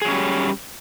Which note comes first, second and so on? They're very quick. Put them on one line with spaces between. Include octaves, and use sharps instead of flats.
G#4 F#3 C#4 G3